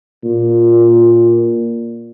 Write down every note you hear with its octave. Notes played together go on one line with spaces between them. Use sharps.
A#2